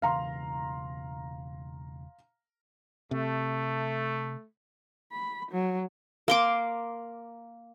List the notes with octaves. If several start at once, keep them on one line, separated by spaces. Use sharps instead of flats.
E1 C#3 E3 F5 A#5 C6
C3 A3
B5
F#3
A#3 C6 D6